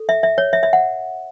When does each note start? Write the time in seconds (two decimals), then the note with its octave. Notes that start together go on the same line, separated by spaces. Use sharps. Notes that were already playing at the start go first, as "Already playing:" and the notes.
Already playing: A4
0.09 E5
0.23 E5
0.38 C#5
0.53 E5
0.63 E5
0.73 F#5